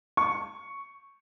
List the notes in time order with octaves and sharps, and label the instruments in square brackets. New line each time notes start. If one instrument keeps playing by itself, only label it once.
[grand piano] C#6